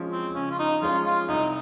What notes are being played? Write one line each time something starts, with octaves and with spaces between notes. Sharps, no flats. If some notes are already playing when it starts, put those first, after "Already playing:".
Already playing: F3 G#3 C#4
C4
C#3 C#4
F4
D#4
F3 G#3 C#4 F4
F4
C2 D#4